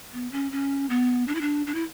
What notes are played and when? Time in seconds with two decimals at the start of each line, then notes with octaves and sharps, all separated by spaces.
0.13 B3
0.32 C#4
0.52 C#4
0.90 B3
1.28 D4
1.35 E4
1.41 D4
1.67 D4
1.75 E4